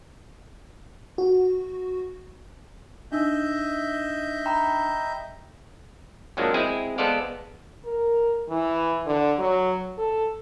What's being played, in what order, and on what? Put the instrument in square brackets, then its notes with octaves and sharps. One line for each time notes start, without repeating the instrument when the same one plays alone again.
[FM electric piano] F#4
[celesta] D4 D#4 E6 [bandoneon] D#5 E5 G6
[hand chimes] G5 A#5 B5
[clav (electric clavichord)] F2 F3 F#3 G#3 A#3 D4
G#3 C4 E4 G#4
G#3 B3 A4 C5 D5 F5
[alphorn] A#4
E3
D3
F#3
A4